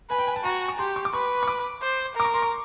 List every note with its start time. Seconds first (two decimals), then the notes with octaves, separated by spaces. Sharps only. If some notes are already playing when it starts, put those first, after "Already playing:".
0.10 B4 G#5
0.19 G5
0.27 G#5
0.36 A5
0.45 F#4 A#5
0.68 C#6
0.79 G4 C6
0.96 C#6
1.05 D6
1.13 B4 C#6
1.43 C#6
1.48 D6
1.82 C5
2.16 A#4 D6
2.25 C#6
2.34 C6
2.42 C#6